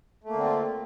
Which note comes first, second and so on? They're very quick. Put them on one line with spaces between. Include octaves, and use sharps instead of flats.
A3 A#3 D3 C4 F4